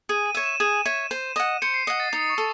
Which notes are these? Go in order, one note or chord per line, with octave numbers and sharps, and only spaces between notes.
G#4 D#7
D#7
C#5 E5
E7
G#4 D#7
C#5 E5
C5
D#5 F#5
C5 C#7
C7
D#5 F#5 C#7
A6
D#4 D#6
C#6
A4